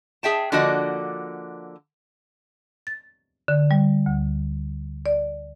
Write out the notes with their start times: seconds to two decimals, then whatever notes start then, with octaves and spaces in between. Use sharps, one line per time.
0.23 G#4 E5 G5 A5
0.52 D3 F3 A#3 F#4 D5 D#5
2.87 A6
3.48 D3
3.71 G3
4.06 D2
5.06 D5